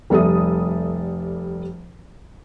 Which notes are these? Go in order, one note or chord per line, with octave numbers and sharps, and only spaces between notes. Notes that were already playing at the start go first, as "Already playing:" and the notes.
F1 G3 A4 E5 D#6